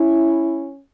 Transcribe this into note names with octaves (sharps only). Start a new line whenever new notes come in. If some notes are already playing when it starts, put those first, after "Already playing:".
Already playing: C#4 E4